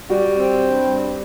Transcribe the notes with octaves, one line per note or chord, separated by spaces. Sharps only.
G3 F#4
C4
G2
G3